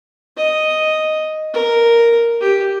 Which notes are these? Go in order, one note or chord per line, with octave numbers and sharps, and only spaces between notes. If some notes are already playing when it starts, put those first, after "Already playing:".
D#5
A#4
G4